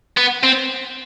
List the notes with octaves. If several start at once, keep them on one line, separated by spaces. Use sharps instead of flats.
B3
C4